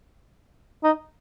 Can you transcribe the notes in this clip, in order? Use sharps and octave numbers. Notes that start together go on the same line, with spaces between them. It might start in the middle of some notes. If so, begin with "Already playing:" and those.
D#4